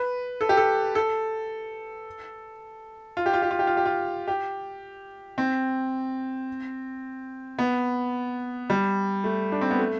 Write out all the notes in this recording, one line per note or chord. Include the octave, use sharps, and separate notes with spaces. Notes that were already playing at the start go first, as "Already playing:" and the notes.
Already playing: B4
A4
G4
A4
A4
F4
G4
F4
G4
F4
G4
F4
G4
F4
G4
C4
B3
G3
A3
D4
C4
B3
A3